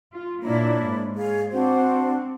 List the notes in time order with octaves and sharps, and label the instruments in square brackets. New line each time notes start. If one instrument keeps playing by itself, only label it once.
[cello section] F4
[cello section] A#2 A#3 E4 [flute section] D4 C#5 B5
[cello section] G#2
[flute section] G#4 C#5 F5
[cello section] C4 [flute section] D4 F#4 C5